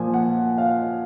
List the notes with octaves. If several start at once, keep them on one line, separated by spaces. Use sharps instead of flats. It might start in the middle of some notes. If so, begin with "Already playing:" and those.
Already playing: A#2 F3 G#5
F#5
F5